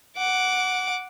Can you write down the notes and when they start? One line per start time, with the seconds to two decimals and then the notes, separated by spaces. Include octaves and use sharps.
0.17 F#5 D6